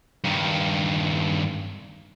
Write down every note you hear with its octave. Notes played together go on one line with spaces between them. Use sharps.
G2 D#3